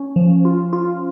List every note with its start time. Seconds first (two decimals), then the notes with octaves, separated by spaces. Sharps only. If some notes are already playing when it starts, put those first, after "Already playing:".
Already playing: C#4
0.16 F3
0.45 F4
0.73 F4